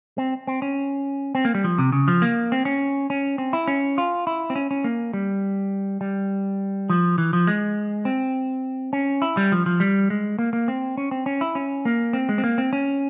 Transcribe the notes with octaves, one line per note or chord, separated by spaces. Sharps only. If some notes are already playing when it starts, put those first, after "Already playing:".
C4
C4
C#4
C4
A#3
G3
F3
C3
C#3
F3
A#3
C4
C#4
C#4
C4
E4
C#4
F4
E4
C4
C#4
C#4
A#3
G3
G3
F3
E3
F3
G#3
C4
C#4
E4
G3
F3
F3
G3
G#3
A#3
A#3
C4
C#4
C4
C#4
E4
C#4
A#3
C4
G#3
C4
A#3
C4
C#4